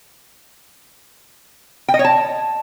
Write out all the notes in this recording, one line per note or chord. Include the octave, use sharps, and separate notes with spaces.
G5
D#5
C#5
A5